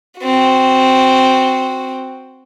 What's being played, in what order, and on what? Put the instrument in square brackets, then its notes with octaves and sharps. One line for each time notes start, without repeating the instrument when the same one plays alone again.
[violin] C4 F#4